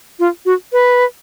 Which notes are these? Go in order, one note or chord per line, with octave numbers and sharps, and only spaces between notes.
F4
F#4
B4